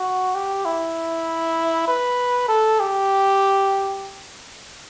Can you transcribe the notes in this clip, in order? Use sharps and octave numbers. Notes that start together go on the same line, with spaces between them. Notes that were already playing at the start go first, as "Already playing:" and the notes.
Already playing: F#4
G4
E4
B4
A4
G4